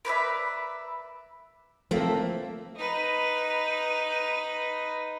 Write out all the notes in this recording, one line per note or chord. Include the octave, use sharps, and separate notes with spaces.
A#4 B4 D5 E5
F3 A3 A#3 C4
D#4 B4